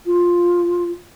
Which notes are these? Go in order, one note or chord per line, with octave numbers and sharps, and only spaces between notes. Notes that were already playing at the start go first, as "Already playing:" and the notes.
F4